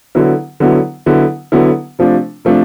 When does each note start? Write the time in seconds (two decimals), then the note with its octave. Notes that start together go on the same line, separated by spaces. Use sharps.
0.15 D3 F#3 B3 E4
0.60 D3 F#3 B3 E4
1.06 D3 F#3 B3 E4
1.52 D3 F#3 B3 E4
1.99 C3 F3 A3 D4
2.45 C3 F3 A3 D4